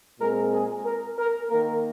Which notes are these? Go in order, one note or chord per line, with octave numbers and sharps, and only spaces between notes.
A#2 G#3 C4 A#4
G#4
A#4
A#4
D#3 A#3 A#4